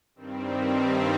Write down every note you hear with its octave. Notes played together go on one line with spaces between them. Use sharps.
G2 D#3 G3 C4